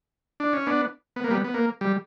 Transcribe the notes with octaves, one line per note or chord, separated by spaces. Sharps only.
D4
C#4
B3 D4
B3
A#3
G3 B3
B3
A#3
G3